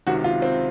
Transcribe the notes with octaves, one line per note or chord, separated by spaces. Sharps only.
C#2 C3 D#3 F#4
F4
C4